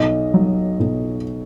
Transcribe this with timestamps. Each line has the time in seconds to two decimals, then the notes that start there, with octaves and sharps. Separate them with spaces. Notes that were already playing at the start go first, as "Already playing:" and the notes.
Already playing: B1 D#5
0.34 F#3
0.80 B1